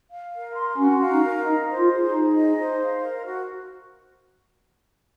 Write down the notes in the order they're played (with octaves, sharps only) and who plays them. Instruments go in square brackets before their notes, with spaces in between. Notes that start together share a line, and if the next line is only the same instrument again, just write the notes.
[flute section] F5
A#4
C6
[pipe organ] C#4 [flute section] F#4
[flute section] F5
[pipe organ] D#4
[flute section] A#4
[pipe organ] D#4 [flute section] D#5
[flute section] C5
[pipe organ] F4
[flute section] G#4
[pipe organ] D#4 [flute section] G#4
[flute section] D#5
C5
F5
A#4
F#4